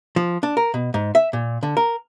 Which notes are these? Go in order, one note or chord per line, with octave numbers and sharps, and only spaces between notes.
F3
D4
A#4
B2
G#2
E5
A#2
D3
A#4